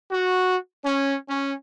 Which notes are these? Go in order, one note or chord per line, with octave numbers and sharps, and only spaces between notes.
F#4
C#4
C#4